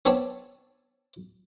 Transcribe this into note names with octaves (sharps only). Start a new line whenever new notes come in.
B3 C4 D4 C#5